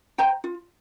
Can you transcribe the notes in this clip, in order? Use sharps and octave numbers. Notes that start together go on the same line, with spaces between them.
C5 G5 A#5
F4